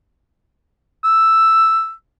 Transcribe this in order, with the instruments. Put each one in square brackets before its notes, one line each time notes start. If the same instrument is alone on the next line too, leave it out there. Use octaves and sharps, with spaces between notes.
[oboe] E6